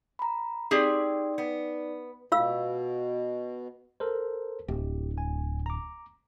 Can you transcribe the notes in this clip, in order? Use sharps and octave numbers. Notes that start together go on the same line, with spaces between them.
A#5 B5
C4 D#4 G4 G#4 D5
B3
B2 F4 F5 E6
A4 A#4 C5
D1 G4
D2 G#5
A#5 D6